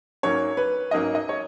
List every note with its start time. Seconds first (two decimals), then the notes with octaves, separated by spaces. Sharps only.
0.23 G#2 F#3 A#3 C#4 C#5
0.57 B4
0.91 G#2 F#3 A#3 C#4 D#5
1.15 D#5
1.29 C#5